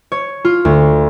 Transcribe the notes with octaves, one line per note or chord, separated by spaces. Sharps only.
C#5
F4
D2